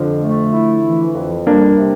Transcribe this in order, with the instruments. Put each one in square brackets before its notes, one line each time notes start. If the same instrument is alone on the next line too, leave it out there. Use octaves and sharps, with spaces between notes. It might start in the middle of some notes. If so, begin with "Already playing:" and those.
Already playing: [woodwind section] F2 [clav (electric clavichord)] D3 F3
[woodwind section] A3
E4
E3
F2
[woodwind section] G3 [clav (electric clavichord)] A#3 D4
[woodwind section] C3